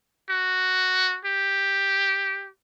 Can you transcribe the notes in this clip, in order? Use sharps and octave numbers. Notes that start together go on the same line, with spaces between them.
F#4
G4